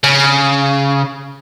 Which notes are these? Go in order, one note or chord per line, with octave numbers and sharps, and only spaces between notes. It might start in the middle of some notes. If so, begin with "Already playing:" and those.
C#3